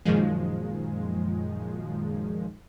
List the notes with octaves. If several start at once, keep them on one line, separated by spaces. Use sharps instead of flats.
F#2 A#2 D#3 F3 G#3